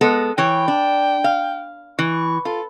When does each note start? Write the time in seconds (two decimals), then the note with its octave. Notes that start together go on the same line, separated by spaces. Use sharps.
0.01 G#3 B3 A4
0.38 E3 C#5 G5
0.68 D4
1.24 F5
1.99 E3 C#6
2.45 F4 A4